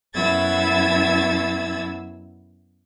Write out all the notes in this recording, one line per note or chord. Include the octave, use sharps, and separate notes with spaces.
F#2 B2 E4 E6 G#6 A6